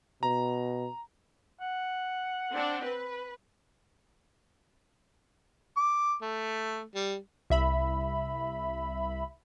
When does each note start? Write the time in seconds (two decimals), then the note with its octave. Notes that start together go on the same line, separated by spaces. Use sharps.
0.23 B2 A#5
1.61 F#5
2.51 C4 D4
2.85 B4
5.77 D6
6.22 A3
6.95 G3
7.50 C2 E5 B5